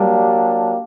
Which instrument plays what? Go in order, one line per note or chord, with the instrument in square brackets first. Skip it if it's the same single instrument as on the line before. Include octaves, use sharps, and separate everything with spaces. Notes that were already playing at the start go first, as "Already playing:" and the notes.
Already playing: [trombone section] F#3 A#3 D4 G4 [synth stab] G3